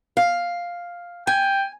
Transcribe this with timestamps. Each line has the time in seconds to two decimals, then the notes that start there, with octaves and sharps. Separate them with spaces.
0.17 F5
1.27 G5 G#5